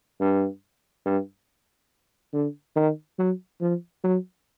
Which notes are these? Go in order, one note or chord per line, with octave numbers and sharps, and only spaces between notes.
G2
G2
D3
D#3
F#3
F3
F#3